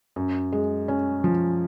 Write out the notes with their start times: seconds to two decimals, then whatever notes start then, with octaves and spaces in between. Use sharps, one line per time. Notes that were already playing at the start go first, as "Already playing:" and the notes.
0.16 F#2
0.52 G#3
0.88 C#4
1.24 F3